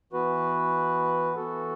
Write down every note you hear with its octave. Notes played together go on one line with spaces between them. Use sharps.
E3 B3 F#4 B4
E3 B3 F#4 A4